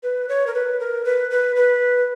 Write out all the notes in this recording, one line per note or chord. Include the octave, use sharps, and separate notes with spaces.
B4
C#5
A#4
B4
A#4
B4
B4
B4